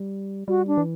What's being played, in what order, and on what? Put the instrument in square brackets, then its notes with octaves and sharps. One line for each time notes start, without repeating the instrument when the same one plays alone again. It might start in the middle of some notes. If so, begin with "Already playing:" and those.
Already playing: [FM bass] G3
[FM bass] G3 [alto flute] F#4
[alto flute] D4
[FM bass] E3